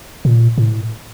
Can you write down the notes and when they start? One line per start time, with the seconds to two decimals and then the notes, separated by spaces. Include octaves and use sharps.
0.25 A#2
0.58 A2